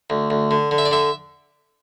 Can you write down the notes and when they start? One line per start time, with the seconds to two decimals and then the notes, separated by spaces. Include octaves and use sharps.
0.10 D2
0.30 D2
0.51 D3
0.71 D3
0.78 E5
0.85 D5
0.91 D3 E5